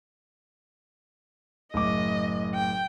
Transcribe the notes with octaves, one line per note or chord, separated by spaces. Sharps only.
F#1 A2 D#5 D6
G5